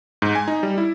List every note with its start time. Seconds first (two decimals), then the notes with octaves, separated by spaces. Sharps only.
0.22 G#2
0.35 G#5
0.48 D#4
0.63 G3
0.78 E4